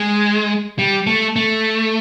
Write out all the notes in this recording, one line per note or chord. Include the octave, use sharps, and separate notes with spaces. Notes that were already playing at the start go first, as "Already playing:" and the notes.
Already playing: G#3
G3
A3
A3